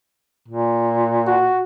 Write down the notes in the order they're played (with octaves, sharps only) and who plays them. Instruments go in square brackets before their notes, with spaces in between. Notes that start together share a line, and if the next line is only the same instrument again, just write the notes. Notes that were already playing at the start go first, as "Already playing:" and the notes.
[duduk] A#2
[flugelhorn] F#4